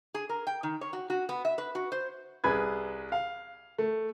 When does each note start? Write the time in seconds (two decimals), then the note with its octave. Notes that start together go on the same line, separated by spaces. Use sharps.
0.14 G#4
0.29 A#4
0.47 G5
0.63 D#3
0.81 C#5
0.93 F#4
1.10 F#4
1.29 B3
1.45 E5
1.58 B4
1.75 F#4
1.92 C5
2.44 C2 G#4 B4 G#6
3.12 F5
3.78 A3